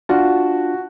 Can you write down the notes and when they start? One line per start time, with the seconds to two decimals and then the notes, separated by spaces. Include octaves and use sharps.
0.09 D4 F4 F#4 A5